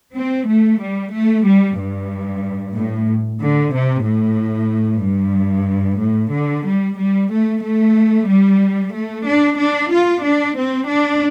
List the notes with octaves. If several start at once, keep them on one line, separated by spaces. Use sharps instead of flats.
C4
A3
G3
A3
G3
G2
A2
D3
C3
A2
G2
A2
D3
G3
G3
A3
A3
G3
A3
D4
D4
F4
D4
C4
D4